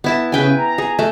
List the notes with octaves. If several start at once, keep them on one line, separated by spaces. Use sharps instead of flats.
B3 E4 A5
C#3 B4 G5 G#5
A#5
G#4
A3